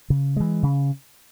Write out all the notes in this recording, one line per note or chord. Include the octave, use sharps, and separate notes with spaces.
C#3
E3 G#3
C#3